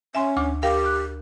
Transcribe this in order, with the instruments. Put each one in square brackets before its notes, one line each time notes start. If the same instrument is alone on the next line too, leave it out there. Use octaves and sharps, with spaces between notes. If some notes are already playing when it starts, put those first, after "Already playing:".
[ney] C#4 [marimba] E5 G#5 C6
[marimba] D2 D6
[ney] G4 [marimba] A#4 F5 G5
[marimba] F#6